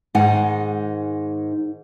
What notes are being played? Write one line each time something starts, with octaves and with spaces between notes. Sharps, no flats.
G#2 D#3 G#3 D#4 F#5 G#5